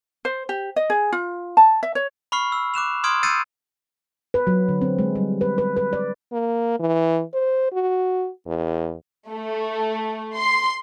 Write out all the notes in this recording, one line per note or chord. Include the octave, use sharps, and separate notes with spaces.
C5
G4
D#5
G#4
F4
A5
E5
C#5
B5 C#6 F6 C7
E6
D6 F#6 E7 F7
C6 D#6 F6 G#6 D7
E6 G6 A6 C7 C#7 D#7
B4
F#3
D3
C4
G#3
G3
B4
B4
B4
D5
A#3
E3
C5
F#4
E2
A3
C6